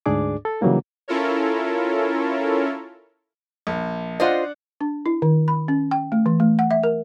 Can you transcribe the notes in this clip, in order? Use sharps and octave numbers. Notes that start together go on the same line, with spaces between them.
D2 G#2 D4 G#4 D5 D6
A4
C#3 E3 F#3 G3 A#3 D#4
C#4 E4 F4 A4 A#4 C#5
A#1
D4 F4 C5 D#5 F#5
D4
E4
D#3
B5
C#4
G5
A3
E3
A3
F#5
E5
A#4